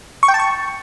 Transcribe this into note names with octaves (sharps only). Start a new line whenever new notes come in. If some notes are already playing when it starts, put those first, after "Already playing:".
C#6
G5
A5
C#6